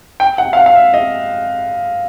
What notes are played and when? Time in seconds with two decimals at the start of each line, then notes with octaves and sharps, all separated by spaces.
0.20 G5
0.38 F#5
0.53 F5
0.57 F#5
0.66 F5
0.75 E5
0.94 D#5